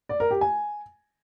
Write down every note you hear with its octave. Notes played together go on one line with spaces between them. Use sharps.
D5
A#4
G4
G#5